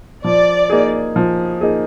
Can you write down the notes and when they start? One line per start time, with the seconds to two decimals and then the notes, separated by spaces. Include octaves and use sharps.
0.24 F3 D5
0.70 A#3 D#4 G#4
1.16 F3
1.61 A#3 D#4 G#4